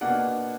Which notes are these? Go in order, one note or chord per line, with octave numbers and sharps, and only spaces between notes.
B2 A#3 D4 F#5